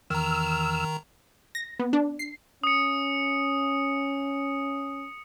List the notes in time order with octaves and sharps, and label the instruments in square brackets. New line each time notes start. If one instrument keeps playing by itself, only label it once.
[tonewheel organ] E2 E6 F6 [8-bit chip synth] D#3 A#5
[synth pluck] A#6
B3
D4
C7
[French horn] C#4 [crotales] D#6 C#7